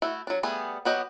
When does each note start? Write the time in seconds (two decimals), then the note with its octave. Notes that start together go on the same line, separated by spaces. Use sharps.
0.02 A3 E4 F#4
0.27 F#3 D4
0.43 G3 A3 B3 G#4 G#5
0.85 F#3 B3 F#4 G4 D#5